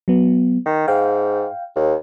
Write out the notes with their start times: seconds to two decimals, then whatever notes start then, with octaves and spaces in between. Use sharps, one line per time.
0.08 F#3 B3
0.66 D#3
0.88 G#2 F5 G5
1.76 D#2